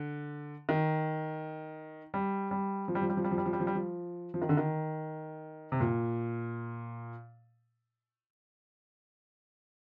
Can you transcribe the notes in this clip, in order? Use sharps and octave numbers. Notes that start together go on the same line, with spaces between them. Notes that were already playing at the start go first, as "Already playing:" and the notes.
Already playing: D3
D#3
G3
G3
F3
G3
F3
G3
F3
G3
F3
G3
F3
G3
F3
G3
F3
F3
D#3
D3
D#3
C3
A#2